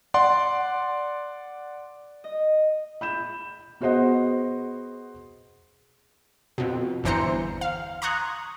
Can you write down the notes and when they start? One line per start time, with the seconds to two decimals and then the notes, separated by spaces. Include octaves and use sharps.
0.14 D5 F#5 C6
2.24 D#5
3.01 B5 G6 E7
3.81 B3 F#4 G#4 C5 D#5 F#5
6.58 F2 B2
7.04 G1 E2 E3 C5 A#5 C#7
7.61 F5
8.02 A#5 C6 C#6 D#6 F#6 G#6